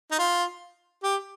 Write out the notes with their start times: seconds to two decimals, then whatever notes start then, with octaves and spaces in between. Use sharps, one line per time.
0.11 D#4
0.19 F4
1.03 G4